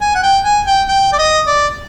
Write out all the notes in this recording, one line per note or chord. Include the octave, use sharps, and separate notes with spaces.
G#5
F#5
G5
G#5
G5
G5
D5
D#5
D5